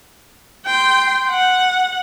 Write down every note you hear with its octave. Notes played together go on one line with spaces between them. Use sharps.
G5 C6
F#5